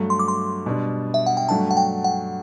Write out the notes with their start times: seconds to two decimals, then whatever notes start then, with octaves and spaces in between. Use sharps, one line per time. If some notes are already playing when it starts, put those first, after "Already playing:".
Already playing: G2 F#3 A3
0.10 C6
0.19 D6
0.28 C6
0.66 B2 G3 D4
1.14 E5
1.26 F#5
1.37 G5
1.49 G2 F#3 A3 D4 A5
1.71 F#5
1.77 G5
2.04 F#5